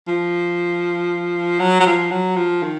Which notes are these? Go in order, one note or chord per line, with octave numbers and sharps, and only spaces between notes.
F3
F#3
F#3
F3
F#3
F3
D#3